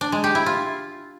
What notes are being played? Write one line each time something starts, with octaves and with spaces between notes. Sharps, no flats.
D4
G#3
G4
E4
F4